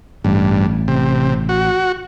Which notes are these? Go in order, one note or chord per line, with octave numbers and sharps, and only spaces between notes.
A1 G2
C3
F#4